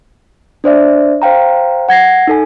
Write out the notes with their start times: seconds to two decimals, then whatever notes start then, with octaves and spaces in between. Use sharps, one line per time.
0.64 D4 C5 D5 E5
1.22 C5 F5 G5 A#5
1.89 F#5 G#6 A#6 C7
2.27 D#4 A4 G#5